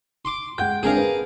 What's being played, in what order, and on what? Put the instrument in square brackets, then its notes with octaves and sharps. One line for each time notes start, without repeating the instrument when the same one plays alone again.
[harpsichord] C6 D6
[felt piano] G#3 F#5 G6 [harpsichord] G5
[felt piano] G#3 C4 D4 [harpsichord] G#4 A#4 F5
[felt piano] B4